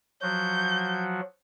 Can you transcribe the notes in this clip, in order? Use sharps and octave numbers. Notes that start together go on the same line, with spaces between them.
F3 F#3 F#4 G6